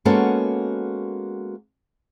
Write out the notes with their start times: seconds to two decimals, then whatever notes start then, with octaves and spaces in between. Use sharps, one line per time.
0.05 G#3 A#3 B3 C#4 F#4 A4